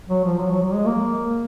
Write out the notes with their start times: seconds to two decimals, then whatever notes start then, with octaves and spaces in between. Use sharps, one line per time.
0.09 F#3
0.24 F3
0.40 F#3
0.51 F#3
0.63 F#3
0.74 G#3
0.86 A#3